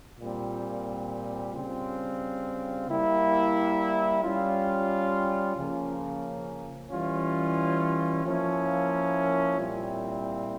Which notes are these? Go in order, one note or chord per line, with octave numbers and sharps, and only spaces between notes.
A#2 G3 C4
C#3 G3 C4 F4
G3 A#3 E4
G3 C#4 F4
C#3 F3 A#3 C#4
E3 G3 C#4 F4
F3 A#3 C#4 E4
A#2 G3 C4 E4